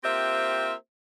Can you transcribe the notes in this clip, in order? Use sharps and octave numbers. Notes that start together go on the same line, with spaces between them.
A#3 C4 F4 G4 C5 E5